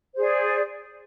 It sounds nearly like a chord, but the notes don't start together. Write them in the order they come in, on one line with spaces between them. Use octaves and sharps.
C5 G#4 D5